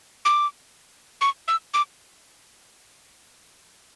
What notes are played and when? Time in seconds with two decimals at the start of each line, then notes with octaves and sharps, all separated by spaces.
0.25 D6
1.21 C#6
1.48 E6
1.74 D6